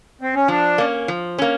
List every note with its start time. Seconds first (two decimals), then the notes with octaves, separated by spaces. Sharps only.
0.21 C4
0.35 C#4
0.48 F3 D4
0.78 A#3 C#4
1.08 F3
1.38 A#3 C#4